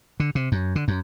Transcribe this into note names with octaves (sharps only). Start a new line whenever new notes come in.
D3
C3
F#2
D3
F#2